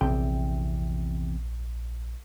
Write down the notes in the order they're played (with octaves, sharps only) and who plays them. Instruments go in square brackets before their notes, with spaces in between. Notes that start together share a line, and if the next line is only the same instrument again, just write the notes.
[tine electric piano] A#1 [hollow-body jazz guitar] E2 C3 G5